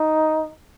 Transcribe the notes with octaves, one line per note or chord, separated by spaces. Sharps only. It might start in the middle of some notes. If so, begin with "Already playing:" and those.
Already playing: D#4